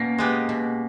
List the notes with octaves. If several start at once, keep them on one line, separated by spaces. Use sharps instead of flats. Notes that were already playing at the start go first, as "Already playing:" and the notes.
Already playing: B2 A#3 C#4
G#3 B3 G4
B2